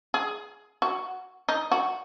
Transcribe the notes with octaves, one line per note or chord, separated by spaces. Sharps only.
G#4
F#4
D#4
F#4